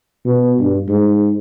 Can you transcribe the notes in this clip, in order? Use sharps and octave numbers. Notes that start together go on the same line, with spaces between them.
B2
G2
G#2